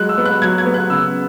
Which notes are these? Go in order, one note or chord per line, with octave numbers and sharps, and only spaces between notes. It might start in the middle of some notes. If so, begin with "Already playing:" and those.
Already playing: F#3 G#3 F#6
E6
B3
F#6
F#3 G#6
G#6
B3
F#6
C#3 E6